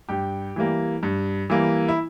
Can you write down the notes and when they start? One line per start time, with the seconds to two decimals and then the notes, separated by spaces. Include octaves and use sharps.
0.09 G2 G4
0.56 E3 G3 A#3
1.03 G2
1.50 E3 G3 A#3
1.88 E4